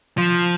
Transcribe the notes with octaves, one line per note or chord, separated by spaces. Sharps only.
F3